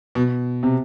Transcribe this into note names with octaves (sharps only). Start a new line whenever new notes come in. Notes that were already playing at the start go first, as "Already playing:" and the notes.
B2
C3